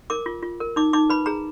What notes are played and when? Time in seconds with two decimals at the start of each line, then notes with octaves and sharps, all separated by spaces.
0.10 A#4 D6
0.26 F4
0.43 F4
0.60 A#4
0.76 D#4 D6
0.93 D#4 D6
1.10 B4 B5
1.26 G#4 A#5